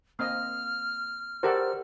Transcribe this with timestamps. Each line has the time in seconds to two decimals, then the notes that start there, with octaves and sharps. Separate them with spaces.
0.19 A#3 C4 D#5 F6
1.43 F#4 G4 A4 A#4 C5 D5